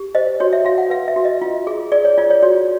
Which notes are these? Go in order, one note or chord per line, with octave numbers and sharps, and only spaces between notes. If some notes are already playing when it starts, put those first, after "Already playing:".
Already playing: G4
C5 D#5
F#4 C#5
E5
F#4 F5
F#5
B4 F5
E5
F#4
D#5
F4
G#4
G#4 D5
C#5
F4 D5
C#5
F#4 C#5